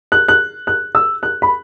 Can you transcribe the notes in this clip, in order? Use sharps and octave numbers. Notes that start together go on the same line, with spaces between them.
F#6
F#6
F#6
E6
F#6
B5